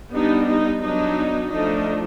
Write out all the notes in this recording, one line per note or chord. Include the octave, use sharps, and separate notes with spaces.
G3 B3 D4 D#4
D#4
F#3 B3 D4 D#4
F3 A3 D4 D#4